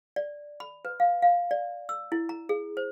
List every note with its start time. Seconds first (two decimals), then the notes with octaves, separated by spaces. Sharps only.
0.16 D5
0.60 B5
0.85 B4
1.00 F5
1.22 F5
1.51 D5
1.89 E6
2.12 E4
2.29 A#5
2.49 G#4
2.77 C5